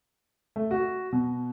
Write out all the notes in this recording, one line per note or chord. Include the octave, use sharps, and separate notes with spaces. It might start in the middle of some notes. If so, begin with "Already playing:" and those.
A3
F#4
B2